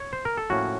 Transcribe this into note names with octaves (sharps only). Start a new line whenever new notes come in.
C#5
C5
A#4
A4
A2 F3 A#3 C#4 F#4